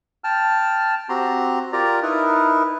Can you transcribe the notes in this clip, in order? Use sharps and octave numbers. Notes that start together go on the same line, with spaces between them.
G5 A5 F6
C4 F#4 G4 A#5 C6
F4 G4 A#4 D5 A#5
D#4 E4 A#4 B4